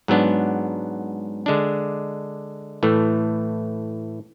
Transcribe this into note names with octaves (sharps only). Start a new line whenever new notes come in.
G#2 F#3 B3 D4
D3 G#3 D4
A2 E3 A3